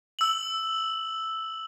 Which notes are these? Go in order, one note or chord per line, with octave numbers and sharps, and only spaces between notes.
E6 F#7